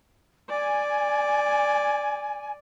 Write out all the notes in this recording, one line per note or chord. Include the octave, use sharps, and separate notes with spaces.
D5 G#5